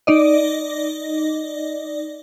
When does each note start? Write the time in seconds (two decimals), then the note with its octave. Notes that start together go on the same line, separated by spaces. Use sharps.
0.07 D#4 D5 D#5